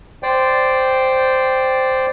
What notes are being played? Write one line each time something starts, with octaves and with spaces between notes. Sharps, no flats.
C5 D5 G5